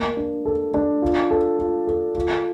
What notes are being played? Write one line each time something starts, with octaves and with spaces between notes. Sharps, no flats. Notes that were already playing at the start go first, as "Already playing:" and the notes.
Already playing: A#3
D4
A4
D4
F4
A4
F4
A4
F4